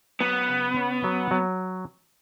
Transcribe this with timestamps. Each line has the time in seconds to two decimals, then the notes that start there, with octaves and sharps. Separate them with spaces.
0.20 F#3 B3
0.48 C#3
0.76 C#4
1.04 F#3
1.31 F#3